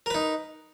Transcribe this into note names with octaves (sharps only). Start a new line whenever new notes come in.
D#4 A#4 B4